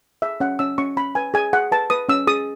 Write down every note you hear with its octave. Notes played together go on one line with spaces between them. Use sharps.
G#4 E5
C#4 F#5
C#4 E6
C#4 C#6
C#4 B5
B4 G#5
G#4 G#5
G#4 F#5
B4 A5
B4 D#6
C#4 E6
G#4 D#6